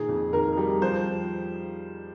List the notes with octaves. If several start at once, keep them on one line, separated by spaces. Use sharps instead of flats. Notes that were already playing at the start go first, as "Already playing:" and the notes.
Already playing: A#2 D#3 G#4
F2
D#3 A#4
G3
F3 C5